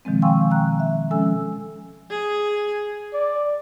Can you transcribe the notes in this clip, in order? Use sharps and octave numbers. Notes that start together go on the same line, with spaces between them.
B2 D#3 F3 G#3 C4
F5 G5 G#5 C6 C#6 E6
G5 A#5 F#6
E5
F3 G#3 C#4 A4 G#5 E6
G#4
D5